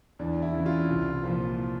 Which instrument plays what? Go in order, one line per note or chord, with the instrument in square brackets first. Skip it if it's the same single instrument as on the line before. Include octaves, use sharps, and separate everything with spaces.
[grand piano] E2 D4
E4
C#3 E3
F4
C2
A#2 F3